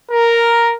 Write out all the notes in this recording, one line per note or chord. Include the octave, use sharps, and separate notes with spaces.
A#4